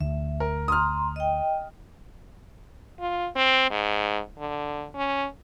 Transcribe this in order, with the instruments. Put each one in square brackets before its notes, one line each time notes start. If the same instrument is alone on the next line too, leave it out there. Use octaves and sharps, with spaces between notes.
[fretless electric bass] D2 [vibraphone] E5
[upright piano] A#4
[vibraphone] A#5 C6 [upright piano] D#6 F6
[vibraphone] D#5 G5
[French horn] F4
C4
G#2
D3
C#4